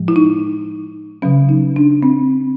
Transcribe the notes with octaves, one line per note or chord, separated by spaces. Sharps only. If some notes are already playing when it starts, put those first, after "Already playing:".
Already playing: A2 F3 G#3
E4
D#4
C#3 F#3 C#4
D#4
D4
C4